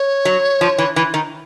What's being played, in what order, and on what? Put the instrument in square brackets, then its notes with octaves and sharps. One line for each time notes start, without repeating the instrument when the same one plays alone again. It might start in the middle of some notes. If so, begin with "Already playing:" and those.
Already playing: [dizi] C#5
[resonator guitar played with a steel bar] F#3
F3
E3
E3
D#3